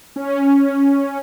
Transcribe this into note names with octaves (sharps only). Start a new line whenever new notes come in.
C#4